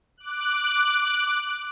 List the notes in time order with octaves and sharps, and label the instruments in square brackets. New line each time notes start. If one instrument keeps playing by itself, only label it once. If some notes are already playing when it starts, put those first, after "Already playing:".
[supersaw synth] D6 F#6